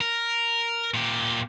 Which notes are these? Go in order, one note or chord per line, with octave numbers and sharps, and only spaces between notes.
A#4
A#2 G4